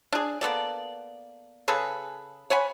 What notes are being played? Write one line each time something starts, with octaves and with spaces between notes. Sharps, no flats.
D4 G#4
A#3 B3 A4 D5
C#3 G#4 A4 B4
C#5 F#5 G#5 B5